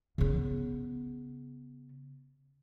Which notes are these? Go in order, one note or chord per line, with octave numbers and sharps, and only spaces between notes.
C#3 B3